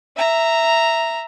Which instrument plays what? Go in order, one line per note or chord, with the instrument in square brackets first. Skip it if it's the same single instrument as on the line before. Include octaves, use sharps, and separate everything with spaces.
[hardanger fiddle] E5 A#5